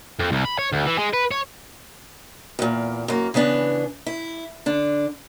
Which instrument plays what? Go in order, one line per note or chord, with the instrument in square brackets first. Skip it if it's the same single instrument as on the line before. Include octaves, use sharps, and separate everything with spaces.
[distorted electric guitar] F2
C2
B5
C#5
D2
E3
G#3
B4
C#5
[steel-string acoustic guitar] E2 A#2
F#2 A#3
C#3 E3 B3 D4
E4
D3 D4